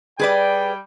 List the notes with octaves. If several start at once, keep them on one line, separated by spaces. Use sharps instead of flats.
G3 G#4 B4 D5 G5